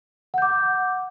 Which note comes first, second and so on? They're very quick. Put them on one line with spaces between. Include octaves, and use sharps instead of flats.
F#5 G6 D6